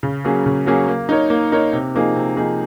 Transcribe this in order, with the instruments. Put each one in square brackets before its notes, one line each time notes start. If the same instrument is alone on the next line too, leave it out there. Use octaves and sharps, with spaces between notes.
[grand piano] C#3
F#3 A#3 C#4 G#4
C#3
F#3 A#3 C#4 G#4
A#3
D#4 A#4 C#5
A#3
D#4 A#4 C#5
C3
F3 A#3 D#4 G#4
C3
F3 A#3 D#4 G#4